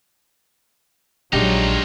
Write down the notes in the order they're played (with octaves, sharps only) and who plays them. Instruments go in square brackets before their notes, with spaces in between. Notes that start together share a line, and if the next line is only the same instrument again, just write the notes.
[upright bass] A#1 [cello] F#3 C#5 [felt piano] G#3 D4 G4 [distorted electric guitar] D#4 F4